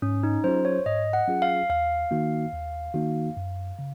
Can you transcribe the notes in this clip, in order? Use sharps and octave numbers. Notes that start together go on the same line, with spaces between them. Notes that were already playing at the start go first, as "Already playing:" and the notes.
G#2 C#4
D#4
F#3 C#4 F4 G#4 C5
C#5
G#2 D#5
F#5
F#3 C#4 F4 G#4
F5
D#2 F5
D#3 A#3 D#4 F#4
D#2
D#3 A#3 D#4 F#4
F#2
C#3